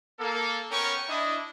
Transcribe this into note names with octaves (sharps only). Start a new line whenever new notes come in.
A#3 A4
B3 C#4 A#4 C#5 G5 C#6
D4 E4 D#5